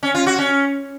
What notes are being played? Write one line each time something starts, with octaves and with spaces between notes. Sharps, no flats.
C#4
F4
F#4
C#4